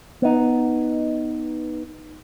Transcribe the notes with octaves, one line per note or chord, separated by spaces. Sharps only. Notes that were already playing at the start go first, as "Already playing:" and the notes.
B3 D#4